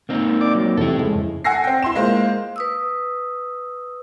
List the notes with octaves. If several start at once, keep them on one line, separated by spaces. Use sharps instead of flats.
A#3 C4 D#4
D5 D6
F#3
F2 C3 E3 E4 A4
F2 C#3 G#3
F#5 G#5 E6 A#6 C7
C4 G5
E4 C6 E7
G#3 A#3 F4 C5
B4 D#6 E6